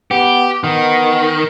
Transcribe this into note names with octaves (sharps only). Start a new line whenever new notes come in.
B3 G4
D#3 B3